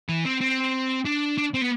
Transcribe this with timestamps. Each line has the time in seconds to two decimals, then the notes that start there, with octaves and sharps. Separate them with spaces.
0.09 E3
0.26 C4
0.41 C4
1.05 D4
1.38 D4
1.54 C4
1.62 B3